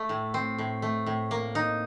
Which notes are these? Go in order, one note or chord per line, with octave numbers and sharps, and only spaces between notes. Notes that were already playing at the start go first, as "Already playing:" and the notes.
Already playing: A3
A2
C4
A2
A3
A2
A#3
D#4